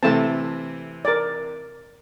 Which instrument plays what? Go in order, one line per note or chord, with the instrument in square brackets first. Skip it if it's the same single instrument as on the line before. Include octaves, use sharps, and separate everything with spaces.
[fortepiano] C3 E3 C4 [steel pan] A3 A4 A5
[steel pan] A#4 D5